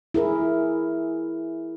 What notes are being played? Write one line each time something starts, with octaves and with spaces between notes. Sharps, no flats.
E4 G#4 A#4